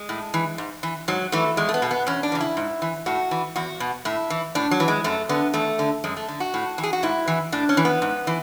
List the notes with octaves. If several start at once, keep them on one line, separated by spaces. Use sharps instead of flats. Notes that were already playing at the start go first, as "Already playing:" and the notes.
Already playing: G#3
A2
E3
G#2
E3
G#2 F#3
E3 A3
E2 G#3
A3
B3
B2
B3
E2 C#4
D4
C#3 E3
E4
G#2
E3
A2 F#4
E3
E2 F#4
B2
A2 E4
E3
A2 D4
F#3
E3
G#3
F#2 A3
D3 B3
E2 A3
D3
F#2 G#3
A3
D3
F#4
A2
E3
G#4
F#4
G#2 E4
E3
A2 D4
C#4
E3
B3
G#2
E3